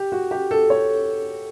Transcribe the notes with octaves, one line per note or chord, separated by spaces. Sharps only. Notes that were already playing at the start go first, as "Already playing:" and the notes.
Already playing: G4
F#4
G4
A4
C#5